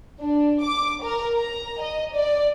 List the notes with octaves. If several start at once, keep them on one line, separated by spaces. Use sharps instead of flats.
D4
D6
A#4
A#5
D#5
D5